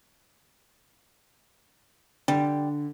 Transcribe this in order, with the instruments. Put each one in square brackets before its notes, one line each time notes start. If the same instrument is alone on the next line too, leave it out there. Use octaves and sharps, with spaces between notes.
[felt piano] D3 [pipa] G3